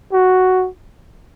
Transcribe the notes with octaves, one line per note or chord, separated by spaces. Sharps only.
F#4